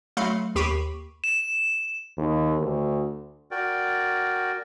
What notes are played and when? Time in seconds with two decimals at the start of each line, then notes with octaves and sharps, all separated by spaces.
0.17 F#3 A3 F5 B5 C6 C#7
0.55 D#2 G4 B5 C#6 C7 D#7
1.24 E7
2.18 D#2
2.59 D2
3.51 F#4 A#4 D5 G5